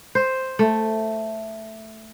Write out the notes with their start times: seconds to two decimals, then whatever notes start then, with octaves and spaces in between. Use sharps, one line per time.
0.15 C5
0.59 A3